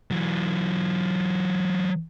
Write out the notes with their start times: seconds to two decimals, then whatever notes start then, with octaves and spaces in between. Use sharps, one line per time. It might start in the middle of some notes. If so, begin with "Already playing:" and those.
0.11 E3 F#3